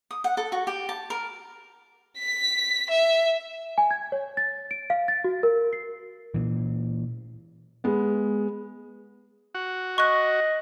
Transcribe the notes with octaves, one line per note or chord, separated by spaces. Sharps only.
D#6
F#5
A4
F#4
G4
A5
A#4
B6
E5
G#5
G#6
C#5
A6
D7
F5
A6
F#4
A#4
C7
A#2 E3
G#3 B3
F#4
D#5 C#6 F#6